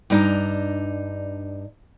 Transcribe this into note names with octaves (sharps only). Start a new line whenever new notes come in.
G2 D4 D#4 A#5